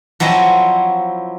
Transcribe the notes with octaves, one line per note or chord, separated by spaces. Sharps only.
F3 F#3 C4 E4 D#5